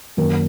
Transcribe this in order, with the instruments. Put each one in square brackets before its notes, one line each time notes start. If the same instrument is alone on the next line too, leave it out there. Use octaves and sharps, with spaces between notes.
[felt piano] F#2 D#3 A#3 A#4